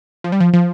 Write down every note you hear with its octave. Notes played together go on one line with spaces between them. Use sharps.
F3
G3
F3
F3